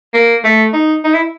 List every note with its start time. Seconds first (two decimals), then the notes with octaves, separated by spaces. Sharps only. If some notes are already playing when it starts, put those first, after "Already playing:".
0.14 A#3
0.44 A3
0.73 D#4
1.04 D#4
1.14 E4